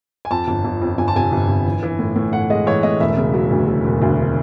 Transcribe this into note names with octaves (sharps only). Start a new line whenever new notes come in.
G#5
F2 A5
G1
G1
F2
G1 G#5
A5
C3 G#5
G1
G1
E3
E3
A2
A2
A2 F#5
G#3 D#5
E3 C#5
A2 D#5
E1 E5
C#3
F#3
D2
F#3
E1
D2